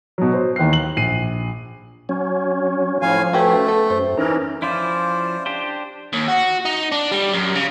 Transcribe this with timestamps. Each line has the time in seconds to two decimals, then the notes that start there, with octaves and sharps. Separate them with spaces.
0.18 B2 F#3
0.34 C5
0.56 D#2 D#3 E3 F#6 C7
0.73 F#7
0.97 A#1 C7 D#7
2.09 F#3 C#4
3.02 A2 F3 C#4 F5 G#5
3.33 A3 F#4 G4 B4
3.67 B3 A4
3.90 F#2 C5
4.18 E3 C#4 D#4 A#4
4.62 F3 C#4 E4 F4 C5 D5
5.46 D4 G4 C5
6.13 D#2
6.28 F#4
6.65 D#4
6.92 D4
7.11 G3
7.33 F#2
7.56 C#3